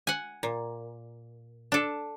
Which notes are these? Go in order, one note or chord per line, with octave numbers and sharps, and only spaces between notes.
F#5 G#5
A#2
D4 A4